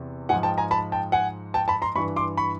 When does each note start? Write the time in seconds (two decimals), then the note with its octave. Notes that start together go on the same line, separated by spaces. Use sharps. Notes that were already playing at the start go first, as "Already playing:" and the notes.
Already playing: E2 C3
0.29 G#2 F#5 G#5
0.34 F3
0.43 G5 A5
0.58 G#5 A#5
0.71 A5 B5
0.92 G5 A5
1.12 F#5 G#5
1.54 G5 A5
1.68 A5 B5
1.82 A#5 C6
1.95 G2 E3 B5 C#6
2.16 C6 D6
2.37 B5 C#6